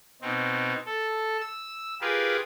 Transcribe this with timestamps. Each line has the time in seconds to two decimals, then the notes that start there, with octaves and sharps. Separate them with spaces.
0.22 B2 C4 D#4
0.86 A4
1.41 E6
2.01 F4 G4 G#4 A#4 B4